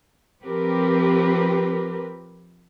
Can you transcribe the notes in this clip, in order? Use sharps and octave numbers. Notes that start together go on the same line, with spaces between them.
F3 C4 G4 A#4 B4